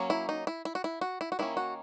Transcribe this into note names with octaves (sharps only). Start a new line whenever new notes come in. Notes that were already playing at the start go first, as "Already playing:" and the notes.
Already playing: F#3 A#3 C#4
E4
D#4
E4
E4
F#4
E4
F#4
E4
F#4
D#3 A#3 C#4 E4
F#4